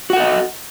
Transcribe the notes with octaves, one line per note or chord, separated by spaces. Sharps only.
F#4 A4 D#5 F#5